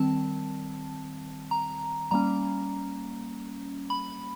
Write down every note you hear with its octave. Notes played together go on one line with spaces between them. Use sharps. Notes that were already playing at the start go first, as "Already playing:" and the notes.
Already playing: D#3 G3 C4 A5
A#5
G3 A#3 C#4 A#5
B5